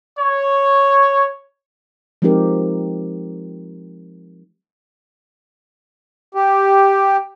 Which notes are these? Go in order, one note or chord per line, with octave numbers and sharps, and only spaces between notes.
C#5
F3 G#3 C4 D#4 G4 A#4
G4